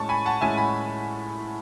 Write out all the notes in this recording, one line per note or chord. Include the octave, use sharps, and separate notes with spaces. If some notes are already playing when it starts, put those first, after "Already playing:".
Already playing: A2 G#3 C#4 A5 C#6
G#5 B5
F#5 A5
A2 G#3 C#4 E5 G#5
G#5 B5